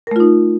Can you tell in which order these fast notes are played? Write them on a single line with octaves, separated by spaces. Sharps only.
A#4 A3 F4 D#4